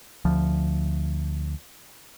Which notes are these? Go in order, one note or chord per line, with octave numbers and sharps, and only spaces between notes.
D2 F3